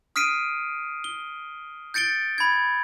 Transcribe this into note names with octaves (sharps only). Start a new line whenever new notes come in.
D#6 F6 B6 C7 D7 D#7
G7
G6 A6 C#7 D7 G7
B5 G#6